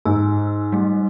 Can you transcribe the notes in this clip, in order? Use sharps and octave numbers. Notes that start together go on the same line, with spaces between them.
G#2 E6
G3 A3